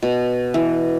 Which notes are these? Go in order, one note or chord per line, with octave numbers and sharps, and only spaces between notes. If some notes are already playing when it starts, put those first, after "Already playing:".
B2
E3